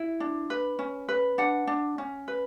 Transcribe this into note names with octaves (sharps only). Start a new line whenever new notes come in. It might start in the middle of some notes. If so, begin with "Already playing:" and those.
Already playing: E4
D4
B4
C#4
B4
D4 F#5
D4
C#4
B4